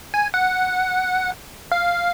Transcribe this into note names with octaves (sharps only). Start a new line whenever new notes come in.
G#5
F#5
F5